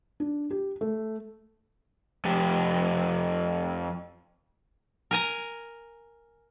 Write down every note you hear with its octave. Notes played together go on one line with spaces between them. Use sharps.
D4
G4
A3
F2 G4
A#4 G#5 A#5